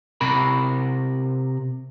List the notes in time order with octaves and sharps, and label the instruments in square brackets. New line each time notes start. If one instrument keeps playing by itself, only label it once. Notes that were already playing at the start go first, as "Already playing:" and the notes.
[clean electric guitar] C3 A#4 B5